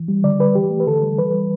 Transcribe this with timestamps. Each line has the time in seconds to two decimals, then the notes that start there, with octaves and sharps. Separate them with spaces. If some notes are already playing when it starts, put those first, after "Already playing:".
Already playing: E3
0.08 G3
0.24 D3 D5
0.39 G3 B4
0.55 E3 G4
0.70 A3
0.80 B4
0.87 D3 A4
1.03 G3
1.18 E3 B4
1.34 G3